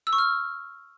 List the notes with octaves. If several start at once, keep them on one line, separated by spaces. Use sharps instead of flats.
E6
C#6
F6